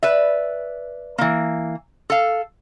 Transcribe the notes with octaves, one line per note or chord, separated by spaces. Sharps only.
B4 D5 E5
E3 A#3
A4 F5